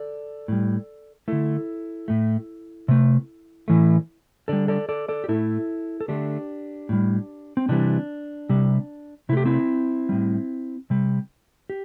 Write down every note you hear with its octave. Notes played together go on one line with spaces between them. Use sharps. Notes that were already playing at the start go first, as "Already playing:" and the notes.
Already playing: A4 D5
A2 G3
D3 A3 E4 A4
A2 A3
C3 A3
A2 E3 A3
D3 G3 A4 D5
A4 D5
A4 D5
A4 D5
G4
A2 A3 E4 A4
A4
D3 A3 D4 G4
A2 G3
C4
C3 E3 G3 D4
C3 G3
C3 A3 E4 G4
C4 E4
A2 G3
C3 G3
G4